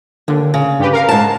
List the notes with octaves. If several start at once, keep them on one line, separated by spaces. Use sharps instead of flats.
D#2 D3
C#3
G2 G4 B4
A#4 F5
G#2 A5